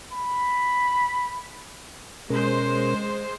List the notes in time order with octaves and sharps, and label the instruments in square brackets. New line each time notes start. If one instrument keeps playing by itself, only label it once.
[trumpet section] B5
[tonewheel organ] B2 C#4 A#4 [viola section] G#3 C5